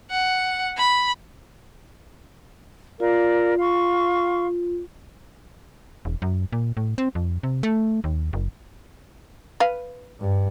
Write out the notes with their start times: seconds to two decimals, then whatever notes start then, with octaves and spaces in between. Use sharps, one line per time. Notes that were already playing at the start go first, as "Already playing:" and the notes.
0.11 F#5
0.77 B5
3.00 F4 A#4 D5 F5
3.58 F5 C6 C#6
6.05 E1
6.22 F#2
6.52 A#2
6.77 A2
6.98 C4
7.15 F2
7.43 C3
7.63 A3
8.04 D#2
8.33 F#1
9.60 B4 F5
10.20 G2